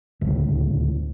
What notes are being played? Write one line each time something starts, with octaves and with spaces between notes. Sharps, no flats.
D1 C#2